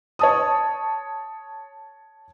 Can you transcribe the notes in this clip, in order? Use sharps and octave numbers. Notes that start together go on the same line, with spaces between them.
C#5 A5 D#6